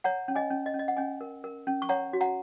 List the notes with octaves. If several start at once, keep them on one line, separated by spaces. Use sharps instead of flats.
C#5 F#5 A#5
C#4
D#5 G#5
C#4
D#5
C#4
D#5
F#5
C#4 D#5 G#5
A#4
A#4
C#4
C#6
C#5 F#5 A#5
F#4
F#5 A#5